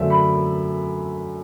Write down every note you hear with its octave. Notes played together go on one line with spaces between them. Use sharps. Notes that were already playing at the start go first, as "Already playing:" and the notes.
Already playing: F#2 D3 A3 D4 C5 D5 E5
B5